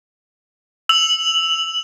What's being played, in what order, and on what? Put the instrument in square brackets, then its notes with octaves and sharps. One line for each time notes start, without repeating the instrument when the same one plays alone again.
[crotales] E6 F7 F#7